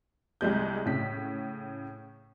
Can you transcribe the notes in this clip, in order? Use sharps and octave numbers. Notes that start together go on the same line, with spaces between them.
C2 G3 G#3 G6
A2 C#3 B6